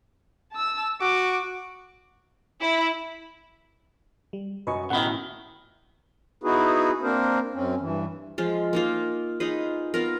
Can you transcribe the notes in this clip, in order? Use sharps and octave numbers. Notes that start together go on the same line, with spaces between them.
A5 E6
F#4 D6
E4
G3
F#2 B4 D#5 G#5 C#6
A1 D2 B2 D#3 E4 F#5 B5
B3 D#4 E4 F#4 G#4 B4
A#3 C4 D4 A#4 C5
F#2 C4 C#4
G2 E3
F3 G#3 F4
A#3 D#4 F4
D#4 F4 G#4 B4
B3 F4 A#4